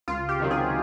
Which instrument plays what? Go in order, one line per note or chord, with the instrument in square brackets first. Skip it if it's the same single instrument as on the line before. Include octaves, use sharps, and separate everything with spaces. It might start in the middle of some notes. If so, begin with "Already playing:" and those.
[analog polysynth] C#2 F4
G4
C3 D#3 F#3
G#4